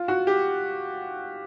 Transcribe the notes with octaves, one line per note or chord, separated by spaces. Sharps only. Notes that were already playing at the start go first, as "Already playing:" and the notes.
Already playing: F4
F#4
G4